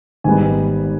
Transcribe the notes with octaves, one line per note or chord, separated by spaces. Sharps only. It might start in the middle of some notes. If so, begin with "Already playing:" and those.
G#1 G#2 G3 B3 G#5